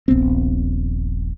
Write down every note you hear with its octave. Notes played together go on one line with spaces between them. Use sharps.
D#1 A#1 B3 C4